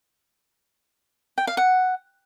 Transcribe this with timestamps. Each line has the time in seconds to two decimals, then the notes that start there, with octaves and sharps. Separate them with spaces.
1.38 G5
1.47 F5
1.57 F#5